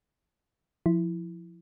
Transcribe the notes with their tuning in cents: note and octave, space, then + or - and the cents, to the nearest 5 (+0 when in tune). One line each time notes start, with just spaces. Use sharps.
F3 +0 E4 +0